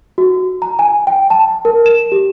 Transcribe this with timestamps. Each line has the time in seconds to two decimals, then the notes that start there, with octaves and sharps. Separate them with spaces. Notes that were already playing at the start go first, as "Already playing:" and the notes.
0.18 F#4
0.62 A#5
0.79 G#5
1.07 G5
1.30 A5
1.65 A#4
1.86 E7
2.12 G4